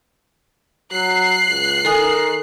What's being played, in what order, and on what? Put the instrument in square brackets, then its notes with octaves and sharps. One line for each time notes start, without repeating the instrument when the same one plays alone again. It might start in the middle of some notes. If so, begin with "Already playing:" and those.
[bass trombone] F#3 [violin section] F#6 C7
[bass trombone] C#2
[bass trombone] D#3 [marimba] A4 G#5 D#6